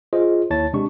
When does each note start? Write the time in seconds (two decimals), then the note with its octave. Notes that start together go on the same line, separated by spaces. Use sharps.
0.13 F4 G#4 C5 D#5
0.50 D#2 E4 C#5 A5 A6
0.73 C3 G#3 D4 G4 C#6